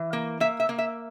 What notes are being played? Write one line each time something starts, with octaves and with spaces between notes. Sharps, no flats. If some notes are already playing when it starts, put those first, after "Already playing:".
Already playing: E3
A#3
A#3 E5
E5
A#3
E5